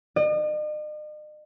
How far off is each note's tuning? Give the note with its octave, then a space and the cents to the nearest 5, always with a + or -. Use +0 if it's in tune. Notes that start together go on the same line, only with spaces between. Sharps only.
D#5 -45